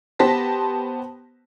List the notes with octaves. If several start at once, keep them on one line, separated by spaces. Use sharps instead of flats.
B3 G4 C5 A5 A#6 B6